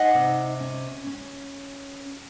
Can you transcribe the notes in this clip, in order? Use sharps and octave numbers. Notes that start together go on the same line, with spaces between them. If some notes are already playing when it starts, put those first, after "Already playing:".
Already playing: D#4 D#5 F#5
C3
C#4
C#4